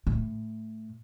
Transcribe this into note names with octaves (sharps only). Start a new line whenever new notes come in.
A2